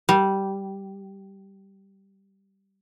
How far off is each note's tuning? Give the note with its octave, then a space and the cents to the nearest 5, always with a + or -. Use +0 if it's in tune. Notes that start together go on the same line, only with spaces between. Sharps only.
G3 -10